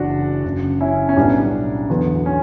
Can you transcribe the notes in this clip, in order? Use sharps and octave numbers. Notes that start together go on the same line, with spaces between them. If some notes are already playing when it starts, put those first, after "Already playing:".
Already playing: F#1 F#2 E3 D4 F#4
F#1 F#2 C#3
C#4 E4
C#4
B1 A2 G3 B3 D4
E2 D3 F#3 B3
C#4